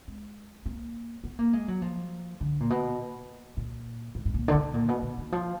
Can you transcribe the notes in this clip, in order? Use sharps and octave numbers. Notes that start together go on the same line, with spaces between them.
G#3
A#3
B3
A#3
G#3
F#3
F3
D3
A#2
B2
A#2
G#2
G#2
A#2
D3
B2
A#2
B2
B2
D#3
F3